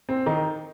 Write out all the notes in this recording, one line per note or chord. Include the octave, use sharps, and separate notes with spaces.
C4
D#3 D#4